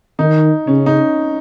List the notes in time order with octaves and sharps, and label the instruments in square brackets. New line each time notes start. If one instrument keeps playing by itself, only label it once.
[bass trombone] D#3 [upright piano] D#4
[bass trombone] C#3 [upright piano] C#4
[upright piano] D#4